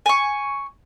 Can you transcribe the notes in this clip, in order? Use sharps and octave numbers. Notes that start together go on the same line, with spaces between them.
G#5 C#6